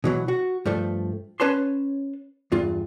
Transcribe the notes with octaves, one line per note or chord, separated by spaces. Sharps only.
B2 E3 F#3
F#4
G2 F3 A3
C#4 B4 C#5 A5 C6
E2 G2 F4